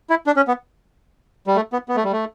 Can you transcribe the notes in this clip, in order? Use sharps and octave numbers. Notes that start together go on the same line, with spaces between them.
E4
D4
C#4
B3
G3
A3
B3
B3
A3
G3
A3